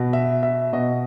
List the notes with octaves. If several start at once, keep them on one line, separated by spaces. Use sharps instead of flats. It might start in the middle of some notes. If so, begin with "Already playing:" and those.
Already playing: B2
E5
E5
B2 D#5